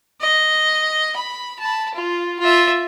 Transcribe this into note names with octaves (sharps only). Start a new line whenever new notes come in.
D#5
B5
A5 B5
F4
F4 E5